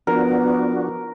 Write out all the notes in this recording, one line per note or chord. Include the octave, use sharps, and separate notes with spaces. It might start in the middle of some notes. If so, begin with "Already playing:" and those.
F3 B3 D4 F#4 A#4